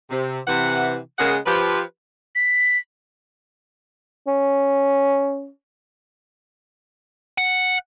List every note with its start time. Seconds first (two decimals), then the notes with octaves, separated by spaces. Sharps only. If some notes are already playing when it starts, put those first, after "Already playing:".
0.10 C3
0.47 C3 E3 F#5
1.19 C#3 G#3 A#3 G#4 A#4 F#5
1.46 F3 G4 B4
2.35 B6
4.27 C#4
7.38 F#5